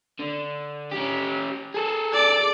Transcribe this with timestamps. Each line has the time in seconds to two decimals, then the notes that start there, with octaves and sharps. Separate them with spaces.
0.19 D3
0.91 C#4 G4
1.74 G#4 A4
2.13 D5 D6